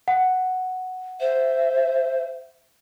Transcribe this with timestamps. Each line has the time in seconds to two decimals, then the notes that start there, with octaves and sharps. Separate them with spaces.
0.08 F#5
1.20 C5 E5